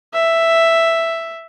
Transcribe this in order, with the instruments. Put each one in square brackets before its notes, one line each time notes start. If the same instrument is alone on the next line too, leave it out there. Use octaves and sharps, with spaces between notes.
[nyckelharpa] E5